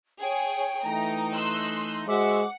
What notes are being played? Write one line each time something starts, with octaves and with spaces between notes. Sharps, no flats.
G#4 C#5 G5
E3 A3 D#4 A#5
C6 E6 F#6
G#3 F#4 C5 E5 F#5 D6